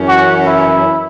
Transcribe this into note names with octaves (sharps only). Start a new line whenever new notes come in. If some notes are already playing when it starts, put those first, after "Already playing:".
Already playing: F#2 E3 C#4
F#4
E4